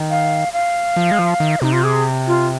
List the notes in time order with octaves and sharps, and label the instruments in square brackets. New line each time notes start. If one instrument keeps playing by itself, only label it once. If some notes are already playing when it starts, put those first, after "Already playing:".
Already playing: [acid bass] D#3
[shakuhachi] F5
F5
[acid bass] F3
G#3
F3
D#3
[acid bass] C3 [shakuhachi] D#4
[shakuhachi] F4
G#4
F4